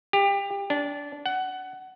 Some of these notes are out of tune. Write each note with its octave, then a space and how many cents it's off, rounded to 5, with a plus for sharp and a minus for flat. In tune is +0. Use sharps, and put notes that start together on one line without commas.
G4 +25
D4 -20
F#5 +20